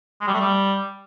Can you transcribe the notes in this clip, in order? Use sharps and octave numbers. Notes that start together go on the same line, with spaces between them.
G#3
G3
A3
G3